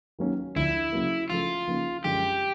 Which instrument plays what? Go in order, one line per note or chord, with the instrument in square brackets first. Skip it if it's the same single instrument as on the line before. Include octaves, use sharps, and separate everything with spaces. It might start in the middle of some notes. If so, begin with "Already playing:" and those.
[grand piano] D#3 F#3 A#3 C#4
[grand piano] D2 D3 F3 [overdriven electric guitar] E4
[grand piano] C#3 F#3 A#3
[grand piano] C#3 F3 A3 [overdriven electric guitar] F4
[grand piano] C#3 F3 A#3 D#4
[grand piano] F#2 D3 F3 G#3 [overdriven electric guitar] G4